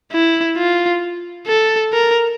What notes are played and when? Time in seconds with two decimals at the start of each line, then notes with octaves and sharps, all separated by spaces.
0.12 E4
0.57 F4
1.47 A4
1.93 A#4